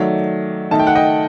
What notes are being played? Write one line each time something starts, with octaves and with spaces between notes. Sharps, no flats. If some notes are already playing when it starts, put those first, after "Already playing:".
Already playing: D#3 F#3 A3 D5
D#3 A3 D#4 A5
G5
F#5
D#5 G5